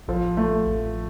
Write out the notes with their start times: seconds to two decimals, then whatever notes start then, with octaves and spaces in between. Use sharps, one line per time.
0.08 A1 F3
0.37 F3 A3
0.67 A1